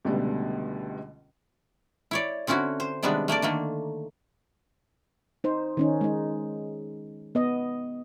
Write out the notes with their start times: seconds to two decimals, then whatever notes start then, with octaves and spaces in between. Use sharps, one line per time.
0.05 C#2 B2 D3 G3 A3
2.11 E4 C#5 D5
2.47 D3 C4 C#4 E4 F#4
2.80 C5
3.03 C3 D#3 G3 G#3 B3 D4
3.28 A3 A#3 A#4 D5
3.42 D3 D#3 A3 A#3
5.44 D#4 C5
5.77 D#3 C#4 D#4
6.01 G#3 D#4
7.35 B3 D#5